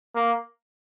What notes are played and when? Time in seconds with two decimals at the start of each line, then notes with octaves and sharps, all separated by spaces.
0.15 A#3